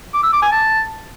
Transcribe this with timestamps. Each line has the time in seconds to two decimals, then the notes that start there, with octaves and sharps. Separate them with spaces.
0.14 D6
0.23 E6
0.33 D6
0.42 G#5
0.52 A5